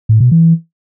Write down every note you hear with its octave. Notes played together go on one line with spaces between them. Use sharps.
A2
B2
E3